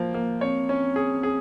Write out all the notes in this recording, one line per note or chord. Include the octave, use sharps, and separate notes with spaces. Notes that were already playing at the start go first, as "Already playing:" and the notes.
Already playing: F3 A#3
A#3
C4 C#5
C#4
G#4
G#4